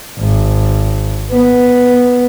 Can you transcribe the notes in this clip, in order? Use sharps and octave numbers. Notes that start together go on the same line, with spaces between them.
G#1
B3